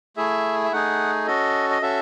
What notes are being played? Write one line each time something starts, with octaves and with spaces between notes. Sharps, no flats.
A3 E4 G#4 E5
E5
A3 D#4 G#4 F#5
C#4 F#4 A4 D#5
D#5
C#4 F#4 A4 E5